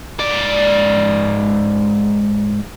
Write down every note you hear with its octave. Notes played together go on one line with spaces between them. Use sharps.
G#2 D5